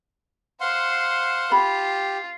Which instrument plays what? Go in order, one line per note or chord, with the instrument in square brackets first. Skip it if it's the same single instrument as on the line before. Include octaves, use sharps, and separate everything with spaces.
[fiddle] C5 [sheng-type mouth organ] F5 F#5 C6
[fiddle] F4 [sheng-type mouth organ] G4 [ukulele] B5